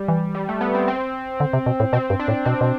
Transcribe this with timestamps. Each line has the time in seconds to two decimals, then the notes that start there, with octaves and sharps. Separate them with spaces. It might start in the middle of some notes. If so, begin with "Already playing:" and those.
Already playing: G3
0.08 E3
0.35 G3
0.49 A3
0.61 B3
0.75 C4
0.88 C4
1.40 D3
1.53 C3
1.66 B2
1.80 A2
1.93 B2 C4
2.10 G2
2.19 D4
2.28 A2
2.45 B2 C4
2.61 B2